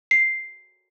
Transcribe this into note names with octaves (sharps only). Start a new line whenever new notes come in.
C7